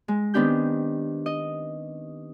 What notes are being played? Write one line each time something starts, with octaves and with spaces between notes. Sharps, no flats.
G#3
D#3 B3 C4 D4 G4 G6
D#5